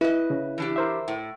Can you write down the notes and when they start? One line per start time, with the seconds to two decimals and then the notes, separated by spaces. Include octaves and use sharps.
0.01 E4 B4 D#5
0.30 C#3
0.58 E3 D4 G4
0.76 A#4 C5 E5
1.08 A2